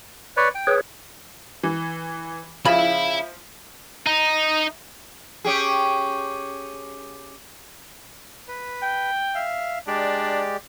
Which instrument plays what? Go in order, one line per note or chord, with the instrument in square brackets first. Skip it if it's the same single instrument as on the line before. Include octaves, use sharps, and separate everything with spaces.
[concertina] B4 C#5 D5
G5
[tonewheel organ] G#4 B4 C#5
[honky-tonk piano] E3
[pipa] C#3 [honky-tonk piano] F3 [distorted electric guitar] E5 B5
[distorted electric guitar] D#4
[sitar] C#4 G4 G#4
[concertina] B4
[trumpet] G5
[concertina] E5 F5
[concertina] G#3 G4 D5 [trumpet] D4